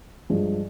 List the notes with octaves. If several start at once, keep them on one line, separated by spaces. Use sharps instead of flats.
G2 F3 G#3